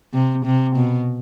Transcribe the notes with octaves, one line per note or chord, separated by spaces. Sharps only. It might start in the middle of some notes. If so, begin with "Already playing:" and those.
C3
C3
B2